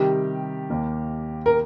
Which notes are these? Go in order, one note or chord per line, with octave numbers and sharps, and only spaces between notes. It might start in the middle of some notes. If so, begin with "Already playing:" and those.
Already playing: C3 D#3 G3 G4
D#2 D#3 A#3
A#4